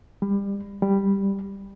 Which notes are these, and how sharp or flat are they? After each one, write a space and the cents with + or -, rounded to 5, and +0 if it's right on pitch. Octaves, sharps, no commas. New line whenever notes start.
G3 +25
G3 +5